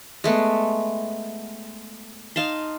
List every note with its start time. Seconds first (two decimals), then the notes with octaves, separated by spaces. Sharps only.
0.24 G#3 A3 B3
2.36 D#4 F5 A5 C6